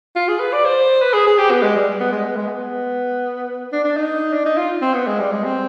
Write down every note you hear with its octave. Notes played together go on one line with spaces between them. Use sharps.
F4
G#4
B4
D5
C5
B4
G#4
G#4
G4
B3
G#3
G3
B3
G#3
B3
G#3
B3
D4
D4
D#4
D4
D#4
F4
C4
B3
G#3
G3
G#3
C4